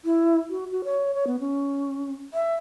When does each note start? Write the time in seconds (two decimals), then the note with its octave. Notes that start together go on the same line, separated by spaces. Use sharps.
0.05 E4
0.50 F#4
0.72 F#4
0.84 C#5
1.14 C#5
1.27 B3
1.40 C#4
2.34 E5